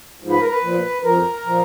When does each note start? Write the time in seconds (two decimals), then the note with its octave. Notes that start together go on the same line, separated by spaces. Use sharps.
0.20 G#2 F3
0.30 B4
0.40 A#4
0.50 B4
0.62 A#2 F3
1.04 F2 F3 A#4
1.46 A#2 F3